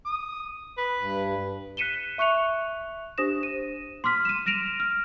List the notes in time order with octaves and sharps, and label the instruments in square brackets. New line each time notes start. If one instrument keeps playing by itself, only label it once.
[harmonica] D#6
[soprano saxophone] B4
[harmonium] G2
[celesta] F#6 B6 C#7 D#7 E7 G7
E5 C#6 F#6 C#7 F7
D4 G4 C5 D#6 A#6 E7
D#7
C6 D6 F6 B6
D#7 E7
F6 A#6 D7 E7 F7
F6